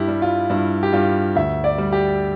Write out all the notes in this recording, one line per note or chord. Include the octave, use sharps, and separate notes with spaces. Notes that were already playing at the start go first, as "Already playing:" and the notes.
Already playing: G2 E4 G4
G3
F4
G2 E4
G4
G2 F4
D2 E5
D5
G3
G4